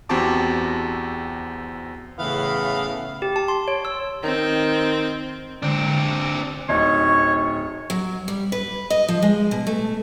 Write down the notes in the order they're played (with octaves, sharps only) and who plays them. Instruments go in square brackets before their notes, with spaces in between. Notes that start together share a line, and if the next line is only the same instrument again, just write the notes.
[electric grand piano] E2 C4 F#4 G4 A5 D6
[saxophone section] A2 C#3 E3 B3 F5
[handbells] G4
A5
C6
C#5
E6
[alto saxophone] D#3 [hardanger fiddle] C4
[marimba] D3 G#3 [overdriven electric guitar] C4 D4
[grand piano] D1 D#4 [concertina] C#5 [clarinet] C#6
[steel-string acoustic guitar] F#3
G3
B4
D#5
F3
G#3
B2
A3